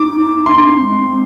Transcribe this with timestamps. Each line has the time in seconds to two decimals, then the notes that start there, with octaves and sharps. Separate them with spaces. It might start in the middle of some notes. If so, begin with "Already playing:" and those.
Already playing: D#4 D6
0.46 D4 C6
0.64 C4
0.81 G#3
0.99 C4